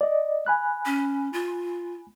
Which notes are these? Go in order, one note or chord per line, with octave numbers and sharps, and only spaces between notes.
D5 D#5
G#5 B5 F#6
C#4
F4